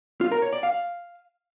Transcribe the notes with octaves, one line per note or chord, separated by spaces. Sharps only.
F4
A#4
C#5
D5
F5